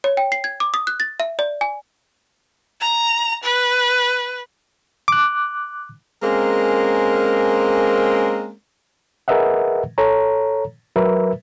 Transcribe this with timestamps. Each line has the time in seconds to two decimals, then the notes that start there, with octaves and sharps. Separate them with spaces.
0.04 C#5
0.17 G5
0.32 C7
0.44 G#6
0.60 D6
0.74 D#6
0.87 F#6
1.00 A6
1.20 E5
1.39 D5
1.61 G#5
2.81 A#5
3.44 B4
5.08 D6 F#6
6.22 G#3 A#3 C4 C#4 A#4
9.28 G#4 A#4 B4 D#5 E5 F#5
9.98 A4 C#5 A#5
10.96 F#3 A#4 B4 E5